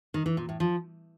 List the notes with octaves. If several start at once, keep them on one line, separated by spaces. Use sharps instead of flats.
D#3
E3
A#2
A2
F3